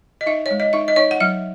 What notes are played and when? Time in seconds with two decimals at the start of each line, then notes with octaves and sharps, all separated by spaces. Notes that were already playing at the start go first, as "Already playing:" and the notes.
0.21 D#5
0.26 D#4 E5
0.46 C#5
0.51 G#3
0.60 D#5
0.73 D#4 E5
0.88 D#5
0.96 D#4 C#5
1.11 F#5
1.20 F#3 E5